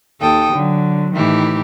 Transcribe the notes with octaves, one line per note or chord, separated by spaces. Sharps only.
D#2 A4 G5 D#6
D3 F#3
A2 D#3 E3 A3 E4 G4